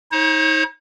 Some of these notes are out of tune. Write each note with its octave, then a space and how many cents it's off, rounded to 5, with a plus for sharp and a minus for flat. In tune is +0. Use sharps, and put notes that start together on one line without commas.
D#4 +35 C#5 -45